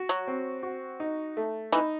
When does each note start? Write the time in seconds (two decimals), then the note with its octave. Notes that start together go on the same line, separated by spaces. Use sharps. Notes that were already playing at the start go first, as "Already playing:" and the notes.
Already playing: F#4
0.09 F#3
0.27 C4
0.63 F#4
1.00 D#4
1.37 A3
1.72 E3 D#4